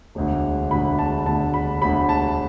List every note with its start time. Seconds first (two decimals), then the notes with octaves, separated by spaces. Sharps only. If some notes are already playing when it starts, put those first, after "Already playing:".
0.15 E1 D2 D3
0.71 E1 D2 D3 B5
0.99 A5
1.26 E1 D2 D3 A5
1.54 B5
1.81 E1 D2 D3 B5
2.09 A5